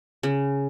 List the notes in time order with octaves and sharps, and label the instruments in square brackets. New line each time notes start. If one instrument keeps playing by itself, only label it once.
[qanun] C#3